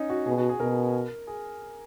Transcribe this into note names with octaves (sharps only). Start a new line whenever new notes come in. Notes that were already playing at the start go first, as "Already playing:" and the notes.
Already playing: C#4 D#4
F#4
B2 G#4
F#4
G#4
B2 A#4
G#4